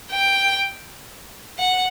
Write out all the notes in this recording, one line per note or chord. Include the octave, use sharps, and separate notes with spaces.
G5
F#5